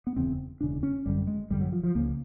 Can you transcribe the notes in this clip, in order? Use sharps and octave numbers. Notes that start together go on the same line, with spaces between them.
B3
E1 E2 C#3 C4
E1 E2 C#3 D4
C#4
G#1 F#2 D3 G3
G#3
G#1 F#2 D3 G3
F#3
F3
F3
C#2 C#3 A#3